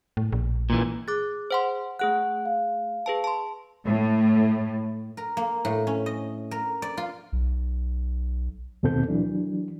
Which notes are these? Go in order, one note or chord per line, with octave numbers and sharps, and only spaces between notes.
A2
A#1
A#2 E3
G#4 D6 F#6 A6
C5 F#5 C6
A3 G#4 F#5 F#6
F5
G#4 B4 A5
A5 C6
A2
A#4
A#3
A2
C#4
D#5
A#4
D5
F4
B1
D#2 B2 C4 A4 G6
E3 F#3 D4